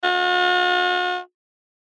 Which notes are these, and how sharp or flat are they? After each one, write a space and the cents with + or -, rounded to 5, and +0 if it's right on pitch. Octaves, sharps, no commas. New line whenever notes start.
F#4 -45